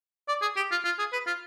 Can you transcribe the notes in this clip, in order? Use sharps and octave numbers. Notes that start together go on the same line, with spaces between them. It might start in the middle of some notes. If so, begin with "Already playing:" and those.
D5
G#4
G4
F4
F4
G#4
B4
F4